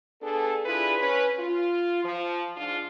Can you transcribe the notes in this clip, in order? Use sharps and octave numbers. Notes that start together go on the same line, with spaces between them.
B3 D4 G#4 A4
D4 E4 F4 G#4 B4
C#4 B4
F4
F3
G#2 D4 F4